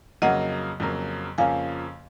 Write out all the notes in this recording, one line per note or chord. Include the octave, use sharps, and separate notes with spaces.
F2 C#3 F#3 A#3 D#5 F#5
F2 C#3 F#3 A#3
F2 C#3 F3 A#3 C#4 F5 G#5